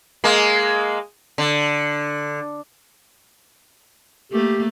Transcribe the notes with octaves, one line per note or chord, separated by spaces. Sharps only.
G#3 A#3
D3
A3 A#3 G4